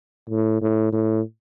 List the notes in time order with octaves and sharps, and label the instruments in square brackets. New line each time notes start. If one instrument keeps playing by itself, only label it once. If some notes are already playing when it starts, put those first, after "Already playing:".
[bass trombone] A2
A2
A2